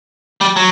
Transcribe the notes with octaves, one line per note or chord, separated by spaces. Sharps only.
G3
F#3